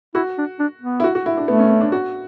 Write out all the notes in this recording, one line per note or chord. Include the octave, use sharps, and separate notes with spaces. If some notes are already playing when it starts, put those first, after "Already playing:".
E4 F#4
D4
D4
B3
E4
F#4
F#4
E4
D4
A3 B3
C#4
C#4
D4
F#4